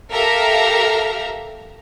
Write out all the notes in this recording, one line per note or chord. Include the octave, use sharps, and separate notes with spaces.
G4 A4 A#4 E5 F5 A#5